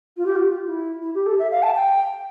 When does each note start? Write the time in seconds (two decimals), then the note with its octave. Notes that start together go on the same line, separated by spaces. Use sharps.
0.17 F4
0.25 G4
0.35 F4
0.66 E4
1.02 E4
1.14 G4
1.26 A4
1.39 E5
1.51 F5
1.62 A5
1.74 G5